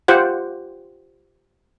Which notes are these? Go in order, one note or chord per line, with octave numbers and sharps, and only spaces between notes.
F4 G4 C5 F#5